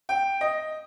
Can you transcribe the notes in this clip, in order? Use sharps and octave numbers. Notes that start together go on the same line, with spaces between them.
G5
D#5